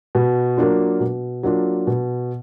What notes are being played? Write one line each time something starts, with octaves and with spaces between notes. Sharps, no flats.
B2
F#3 A#3 D4 F4
B2
F#3 A#3 D4 F4
B2